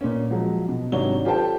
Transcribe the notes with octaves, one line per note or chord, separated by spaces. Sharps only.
A#2 C#4
F3 F#3 G#3
B2
G#1 C3 F#3 D4 C#5 G7
F4 G4 A4 C5 G5 A5